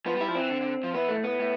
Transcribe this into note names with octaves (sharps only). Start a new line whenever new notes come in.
F3 B3
G3 E4
F3
E3 C4
D3
D3
F3
E3 B3
A3
A2
B3
A2